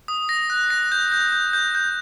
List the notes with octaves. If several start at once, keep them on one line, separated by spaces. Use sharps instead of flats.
D#6
A#6
F#6
A#6
G6
G6
G6
G6
G6